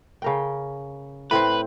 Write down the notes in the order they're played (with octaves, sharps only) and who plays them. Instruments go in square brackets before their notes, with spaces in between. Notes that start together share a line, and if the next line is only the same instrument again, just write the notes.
[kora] C#3 A#4 G5
[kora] A2 C4 C5 [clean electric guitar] B4